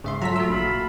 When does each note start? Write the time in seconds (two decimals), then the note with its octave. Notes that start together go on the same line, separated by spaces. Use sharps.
0.04 G#2 C#3 E5 C6
0.22 F#3 F4 A4 E5 A#5 B6
0.36 A3 F#4 E6
0.49 A#1 F5 A5 B5